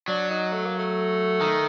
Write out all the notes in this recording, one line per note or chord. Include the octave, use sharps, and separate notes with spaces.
F#3 D4
D#4
A3
A#3
A3
D#3